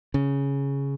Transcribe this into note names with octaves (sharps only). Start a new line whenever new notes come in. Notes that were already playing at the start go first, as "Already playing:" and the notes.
C#3